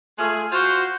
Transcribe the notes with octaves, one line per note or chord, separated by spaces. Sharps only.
G#3 A3 F4 G#4
F4 F#4 C5